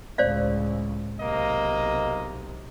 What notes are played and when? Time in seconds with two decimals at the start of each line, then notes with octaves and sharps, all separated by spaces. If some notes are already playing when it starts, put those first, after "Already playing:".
0.18 C#2 A2 C5 D5 F5
1.20 B1 C3 A#3 D#5